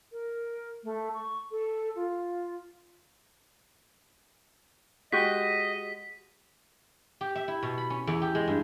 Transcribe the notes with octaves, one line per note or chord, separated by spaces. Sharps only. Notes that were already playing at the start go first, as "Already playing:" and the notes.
A#4
A3
C#6
A4
F4
G#3 F#4 G4 D#5 B6
G4
E5
E4
B2
B5
C#4
E2
G4
G#3
G2